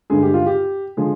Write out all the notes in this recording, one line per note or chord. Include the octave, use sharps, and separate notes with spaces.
G2 D3 G#3 G#4
G4
F4
G4
D3 F3 G#3 G#4